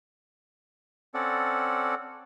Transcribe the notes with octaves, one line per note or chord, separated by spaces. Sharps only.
C4 C#4 A4 D5 F#5